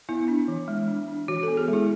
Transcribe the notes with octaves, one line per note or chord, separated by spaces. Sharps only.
B3 E4
D4
E3
G#3
D4
D4
E3 F#4
A4
B3
G#4
G#3 E4